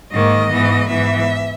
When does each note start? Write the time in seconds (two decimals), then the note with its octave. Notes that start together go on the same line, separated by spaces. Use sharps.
0.11 G#2 D#3 A#3 D#5
0.50 G#2 E3 B3
0.88 G#2 E3 B3 E5